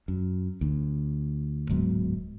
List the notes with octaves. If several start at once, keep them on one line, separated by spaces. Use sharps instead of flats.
F#2
D2
D1 G#2 F#3 B3